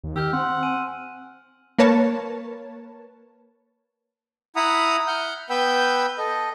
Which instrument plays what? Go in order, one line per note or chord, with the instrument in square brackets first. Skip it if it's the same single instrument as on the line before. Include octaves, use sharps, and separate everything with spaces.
[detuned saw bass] D#2
[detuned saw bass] D#3 [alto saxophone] G4 [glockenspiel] E6 F6 G6
[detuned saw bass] C4 [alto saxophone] F#5 [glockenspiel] C6
[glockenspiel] G#5 D#7
[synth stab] A#3 A#4 B4 C#5 A5
[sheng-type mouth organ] E4 F#5 A#5 B5 D#6
F#5 F6 G6
B3 B4 G5 B5 E6 G6
A4 D#5